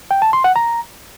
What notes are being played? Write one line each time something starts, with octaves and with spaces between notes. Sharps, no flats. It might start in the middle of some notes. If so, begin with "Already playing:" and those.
G5
A5
C6
F#5
A#5